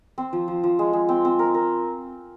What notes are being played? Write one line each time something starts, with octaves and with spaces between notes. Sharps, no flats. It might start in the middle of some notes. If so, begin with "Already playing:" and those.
C4
F3
F3
F3
G#3
G#3
C4
C4
A#4
A#4